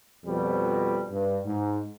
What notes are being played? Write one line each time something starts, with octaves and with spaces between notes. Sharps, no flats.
F2 B2 F3 G3
G2
G#2